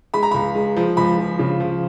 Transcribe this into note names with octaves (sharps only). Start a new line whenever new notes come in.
G#3 B5
A#5
C#2 B5
G#3
F3
C#2 B5
F3
C#3
F3